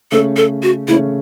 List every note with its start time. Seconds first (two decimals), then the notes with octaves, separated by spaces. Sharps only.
0.12 C#3 A3 C#4 A4
0.37 A4
0.63 F#4
0.88 C#3 A3 C#4 E4